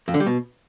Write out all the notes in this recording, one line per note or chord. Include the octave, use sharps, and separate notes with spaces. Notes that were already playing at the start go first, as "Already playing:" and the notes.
F2
D3
G3
B2